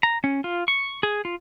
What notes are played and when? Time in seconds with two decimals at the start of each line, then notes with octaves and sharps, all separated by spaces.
0.03 A#5
0.24 C#4
0.44 F4
0.68 C#6
1.03 G#4
1.25 F4